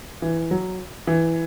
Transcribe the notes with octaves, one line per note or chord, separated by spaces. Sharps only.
E3
F#3
E3